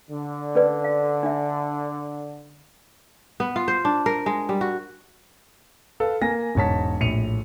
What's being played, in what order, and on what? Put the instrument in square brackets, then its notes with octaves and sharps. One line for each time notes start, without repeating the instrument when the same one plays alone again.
[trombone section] D3
[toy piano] C#4 B4 D5
F5
D4 E5
[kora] B3
F4
C5
D4
A#4
G#3
G3
F#4
[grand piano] A4 B4 F5
A#3 G#5 A#6
E1 G#2 C#5 A5 B6
A#1 A2 C#7 D#7 F7